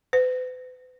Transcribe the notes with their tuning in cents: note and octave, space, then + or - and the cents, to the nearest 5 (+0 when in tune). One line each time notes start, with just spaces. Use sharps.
B4 +40